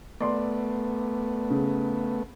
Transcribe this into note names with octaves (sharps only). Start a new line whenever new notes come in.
A3 B3 D5 C6
C#3